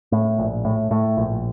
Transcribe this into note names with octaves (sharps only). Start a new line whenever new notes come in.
A2
A#1
A2
A2
A#1